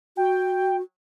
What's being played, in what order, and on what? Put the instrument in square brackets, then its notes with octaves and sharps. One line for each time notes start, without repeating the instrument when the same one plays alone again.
[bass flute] F#4 [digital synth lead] G5